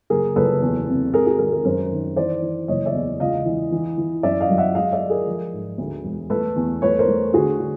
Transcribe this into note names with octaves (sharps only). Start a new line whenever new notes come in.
F#1 G#4 A#4
F#1 A4 B4
E2
C3
G#3 G#4 A#4
F#4 G#4
G#1 G#4 A#4
G#4 A#4
F#2 A#4 C5
D#3
E3 C5 D5
E3
F#1 C#5 D#5
D5 E5
E2
C#2 D#5 F5
E3
E3
E3
F#2 D5 E5
D#5 F5
F#3
E5 F#5
G#3 D#5 F5
D5 E5
G#3
G#4 A#4
F3
G#2
D2
E1
A3 A4 B4
E2
A3 B4 C#5
A#4 C5
A3
D3 F#4 G#4
D3